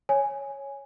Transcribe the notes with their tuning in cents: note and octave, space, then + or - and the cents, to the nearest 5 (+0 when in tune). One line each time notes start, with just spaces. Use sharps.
C#5 +0 G#5 +0